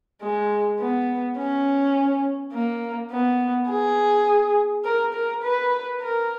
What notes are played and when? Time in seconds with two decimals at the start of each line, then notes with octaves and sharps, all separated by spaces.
0.22 G#3
0.79 B3
1.38 C#4
2.53 A#3
3.11 B3
3.69 G#4
4.85 A#4
5.14 A#4
5.43 B4
6.02 A#4